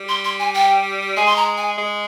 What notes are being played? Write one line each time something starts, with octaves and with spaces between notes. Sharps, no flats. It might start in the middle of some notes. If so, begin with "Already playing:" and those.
Already playing: G3
C6
C6
G#5
G5
G#3 G#5
C6
A#5
G#5
G#3